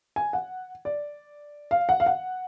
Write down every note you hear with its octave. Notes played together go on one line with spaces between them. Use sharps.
G#5
F#5
D5
F5
F#5
F5
F#5